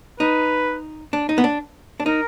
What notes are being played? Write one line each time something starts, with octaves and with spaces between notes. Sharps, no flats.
D#4 B4
D4
D#4
B3
D4
D4
D#4 A#4